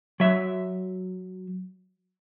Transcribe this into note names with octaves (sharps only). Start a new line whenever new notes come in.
F#3 E5